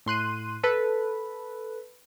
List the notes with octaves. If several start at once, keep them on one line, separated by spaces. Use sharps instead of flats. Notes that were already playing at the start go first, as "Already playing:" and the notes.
A2 C6 F#6 D#7
A4 B4